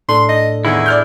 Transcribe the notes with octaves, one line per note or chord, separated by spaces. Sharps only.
A2 D4 A4 C6
D#5
E2 D#3 E4 G#4
D5 F6 G6